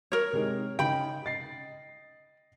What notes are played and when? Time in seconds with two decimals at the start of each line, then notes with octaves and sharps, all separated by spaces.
0.12 A#4 C#5
0.33 C3 G#3 D#4
0.79 C#3 D#4 G5 B5
1.25 D#5 A6 C7